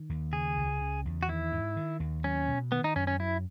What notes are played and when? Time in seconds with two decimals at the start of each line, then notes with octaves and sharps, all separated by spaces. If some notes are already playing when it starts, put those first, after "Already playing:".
Already playing: D#3
0.09 D#2
0.33 C#3 G#4
0.57 C#2
0.81 C#3
1.05 E2
1.23 F#4
1.28 D#3 E4
1.52 G#2
1.76 D#3
2.00 D#2
2.24 F#3 C#4
2.48 B2
2.71 D#3 B3
2.84 D#4
2.96 F#2 C#4
3.07 C#4
3.20 F#3 E4